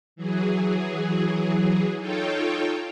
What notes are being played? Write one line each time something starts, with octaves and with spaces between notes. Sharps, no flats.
E3 F#3 G#4
D#4 F4 A4 C#5 G5